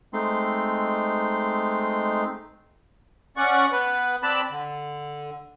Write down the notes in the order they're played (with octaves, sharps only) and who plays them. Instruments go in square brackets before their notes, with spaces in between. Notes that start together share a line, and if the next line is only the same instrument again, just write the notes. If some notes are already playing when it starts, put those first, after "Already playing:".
[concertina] G#3 A3 C4 D#4 C6
[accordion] C#4 D5 F#5 C#6
B3 B4
C4 D5 A5 B5 F#6
D3